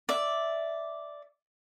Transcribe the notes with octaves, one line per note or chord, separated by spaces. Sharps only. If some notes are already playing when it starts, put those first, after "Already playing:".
D5 E5